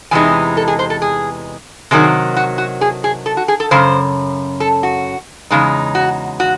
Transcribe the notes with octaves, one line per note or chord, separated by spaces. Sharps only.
E2 C3 E3 G#3 D#4 G#5
A4
G#4
C5
A4
G#4
C3 D#3 F#3 G#4
F#4
F#4
G#4
G#4
A4
F#4
G#4
A4
F#2 C#3 C5
A4
F#4
E2 C#3 G#3 D#4
F#4
F#4